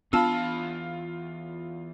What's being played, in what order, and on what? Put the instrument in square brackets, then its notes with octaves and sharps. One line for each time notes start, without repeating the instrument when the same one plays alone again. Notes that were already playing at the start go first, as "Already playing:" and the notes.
[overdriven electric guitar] E2 B5 [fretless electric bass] B3 D4 [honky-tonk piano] F4 [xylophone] A5 E6